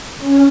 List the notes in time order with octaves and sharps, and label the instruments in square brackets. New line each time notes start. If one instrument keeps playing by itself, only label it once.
[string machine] C#4